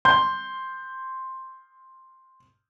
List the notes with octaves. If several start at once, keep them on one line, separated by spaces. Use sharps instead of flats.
C6 G6